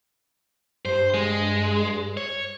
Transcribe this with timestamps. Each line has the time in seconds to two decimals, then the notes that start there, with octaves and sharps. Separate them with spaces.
0.85 G2 C5
1.14 G#3
2.17 C#5